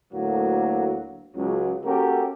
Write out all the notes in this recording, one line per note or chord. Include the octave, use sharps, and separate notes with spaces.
D2 A2 F#3 A#3
C#2 F#3
A#3 C#4 F#4 G4 A4 A#4